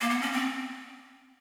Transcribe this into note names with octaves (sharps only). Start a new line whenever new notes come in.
A#3
B3
C#4
C4